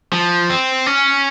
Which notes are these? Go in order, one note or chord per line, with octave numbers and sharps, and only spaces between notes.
F3
C4
C#4